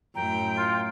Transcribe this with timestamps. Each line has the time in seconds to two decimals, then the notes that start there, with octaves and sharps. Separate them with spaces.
0.15 F#2 A2 G5 A#5
0.57 F4 C6